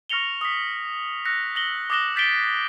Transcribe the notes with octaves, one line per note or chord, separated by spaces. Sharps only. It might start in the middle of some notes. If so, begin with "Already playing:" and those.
C#6 F6 A#6 C#7 F7 G7
D#6 B6
E6 F#6 A#6 C#7
A#6 F#7 G7
D6 D#6 F#6 A#6 E7 G7
G6 A6 B6 C7 D7 G7